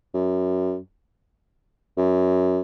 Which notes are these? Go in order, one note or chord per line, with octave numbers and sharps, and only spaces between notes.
F#2
F#2